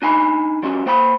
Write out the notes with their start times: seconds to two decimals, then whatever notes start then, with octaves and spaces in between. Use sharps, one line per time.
0.02 D4 D#4 G#5 B5
0.63 F3 G3 C#4 F#4
0.86 A#3 C5 G5 B5